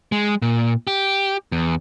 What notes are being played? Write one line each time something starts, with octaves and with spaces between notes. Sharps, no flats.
G#3
A#2
G4
E2